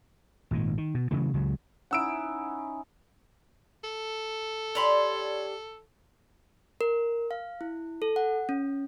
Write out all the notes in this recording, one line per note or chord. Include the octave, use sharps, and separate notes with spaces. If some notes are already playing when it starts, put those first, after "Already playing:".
G#1 A#2 D#3
D#3
B2
C#3 E3 F#3 A3
C#2 C#3 F#3
C#4 D#4 E4 F#5 E6 D7
A4
D4 G4 C#5 B5 C6
A#4
F5
E4
A4
F#5
C#4